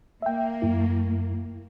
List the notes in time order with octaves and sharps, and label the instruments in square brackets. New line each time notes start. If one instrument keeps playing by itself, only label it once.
[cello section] A#3 [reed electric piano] E5 G5
[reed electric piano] F#2 E4